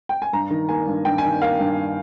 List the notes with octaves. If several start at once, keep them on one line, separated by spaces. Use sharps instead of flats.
G5
G#5
G2 A#5
D#3
A#3 G#5
G2
G2 G5
G#5
D#3
A#3 F5
G2